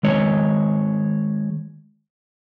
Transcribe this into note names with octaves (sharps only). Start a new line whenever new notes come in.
D#3 G#3 C#5